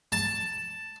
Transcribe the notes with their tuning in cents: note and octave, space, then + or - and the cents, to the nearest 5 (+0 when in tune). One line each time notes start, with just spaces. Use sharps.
A5 +5